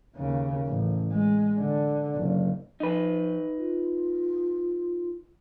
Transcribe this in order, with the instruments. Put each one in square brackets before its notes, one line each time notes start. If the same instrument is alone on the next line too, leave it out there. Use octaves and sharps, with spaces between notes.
[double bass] D#2 C#3
A1
G#3
D3
F#1
[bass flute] F3 [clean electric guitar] D#4 B4
[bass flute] F4